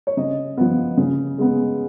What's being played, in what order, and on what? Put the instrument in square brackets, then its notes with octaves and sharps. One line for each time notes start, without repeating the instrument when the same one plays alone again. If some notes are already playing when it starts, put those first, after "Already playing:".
[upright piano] C#5
C#3 D#5
F3 B3
C#3
G#3 B3